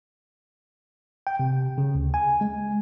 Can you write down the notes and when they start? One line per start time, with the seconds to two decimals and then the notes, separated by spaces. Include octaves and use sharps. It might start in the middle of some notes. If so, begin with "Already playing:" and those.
1.27 G5
1.39 C3
1.78 C#3
1.95 D2
2.14 G#5
2.41 G#3